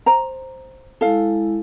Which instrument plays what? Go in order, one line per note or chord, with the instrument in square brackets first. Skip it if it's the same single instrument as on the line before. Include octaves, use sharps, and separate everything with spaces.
[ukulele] C5 A#5
[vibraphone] G#3 E4 [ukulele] A4 F5